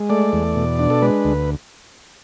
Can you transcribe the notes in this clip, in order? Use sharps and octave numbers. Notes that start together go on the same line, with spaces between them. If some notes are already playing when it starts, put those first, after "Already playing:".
Already playing: G#3
A3 D5
E2
B2
D4
A4
G#3 B4
D2